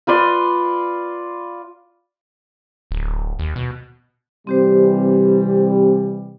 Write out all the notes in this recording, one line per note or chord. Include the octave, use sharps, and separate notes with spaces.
F4 B4 D5 C6
D1
D#2
B2
C3 E3 G3 C4 G4 C5